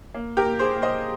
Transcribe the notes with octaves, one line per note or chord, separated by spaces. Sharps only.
A#3
G4 A#4
A#2
G#4 C5
A#2
C5 D#5